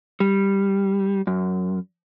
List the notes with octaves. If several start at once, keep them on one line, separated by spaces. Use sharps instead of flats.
G3
F#2